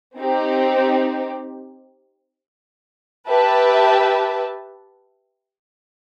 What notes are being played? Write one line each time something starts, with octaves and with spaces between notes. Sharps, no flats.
C4 D#4 G4
G4 B4 E5 A5